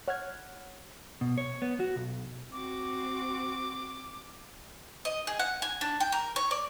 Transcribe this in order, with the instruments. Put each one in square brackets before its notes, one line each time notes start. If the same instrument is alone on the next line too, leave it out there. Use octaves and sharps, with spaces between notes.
[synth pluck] C#5 F#5 F6 F#6 G#6
[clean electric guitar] B2
C#5
B3
F#4
B1
[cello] C4 F#4 [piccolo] D6
[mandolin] D#5
G#4
F#5
G#5
D4
G5
A#4
C#5
D5